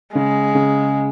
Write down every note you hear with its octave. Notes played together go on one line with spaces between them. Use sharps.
C#3 G#3
C#3